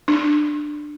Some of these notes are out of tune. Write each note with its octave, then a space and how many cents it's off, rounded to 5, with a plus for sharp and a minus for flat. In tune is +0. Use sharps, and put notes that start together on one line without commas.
D4 +20